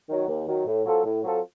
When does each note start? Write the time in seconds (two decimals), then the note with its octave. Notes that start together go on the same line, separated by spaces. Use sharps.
0.09 D#3 F#3
0.29 D#2
0.48 D#3 F#3
0.67 A2
0.86 F#3 C4 F4 A4
1.05 A2
1.24 F#3 C4 F4 A4